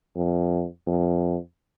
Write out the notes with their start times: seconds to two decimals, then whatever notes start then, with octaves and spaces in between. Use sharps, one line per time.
0.16 F2
0.87 F2